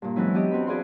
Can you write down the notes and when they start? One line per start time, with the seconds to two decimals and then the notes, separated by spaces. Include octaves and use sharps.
0.02 G2 A#2
0.16 E3 F#3 G#3 C4 C#4 E4
0.34 B3 D4 G4 D#5
0.51 E2 C4 F#4 C5 B5
0.67 E4 F#4 G#4 D5 F5 C6